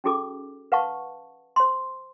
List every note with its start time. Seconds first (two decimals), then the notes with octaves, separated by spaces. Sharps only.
0.04 C#4 D#4 F#4 G#4 A4 D6
0.72 B4 F5 F#5 A5 C#6
1.56 C5 C6